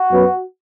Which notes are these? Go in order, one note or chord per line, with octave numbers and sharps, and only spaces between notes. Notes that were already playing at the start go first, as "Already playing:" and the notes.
Already playing: F#4
F#2 F#3 B3